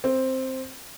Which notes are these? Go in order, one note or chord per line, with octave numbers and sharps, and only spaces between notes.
C4